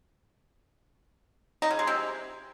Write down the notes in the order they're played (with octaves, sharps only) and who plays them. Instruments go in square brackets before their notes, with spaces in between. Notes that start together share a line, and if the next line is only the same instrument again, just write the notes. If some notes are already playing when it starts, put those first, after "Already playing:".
[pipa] D#4
C#3
G#3
C3